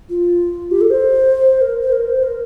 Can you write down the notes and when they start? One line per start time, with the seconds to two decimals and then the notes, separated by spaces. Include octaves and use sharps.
0.10 F4
0.71 G4
0.81 A4
0.90 C5
1.61 A#4
1.82 C5
1.92 A#4
2.07 C5
2.23 A#4